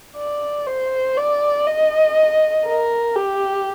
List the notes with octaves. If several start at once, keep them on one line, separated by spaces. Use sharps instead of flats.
D5
C5
D5
D#5
A#4
G4